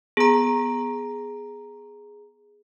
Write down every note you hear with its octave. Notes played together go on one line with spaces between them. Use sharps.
B3 G#4 A#5